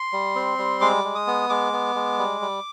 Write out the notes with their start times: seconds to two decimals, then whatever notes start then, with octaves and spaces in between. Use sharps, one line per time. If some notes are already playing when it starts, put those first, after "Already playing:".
Already playing: C6
0.13 G3
0.35 C4
0.58 G3
0.81 G#3 D6
1.04 G#3
1.15 D#6
1.27 B3
1.50 G#3 D6
1.73 B3
1.95 G#3
2.18 G3
2.41 G3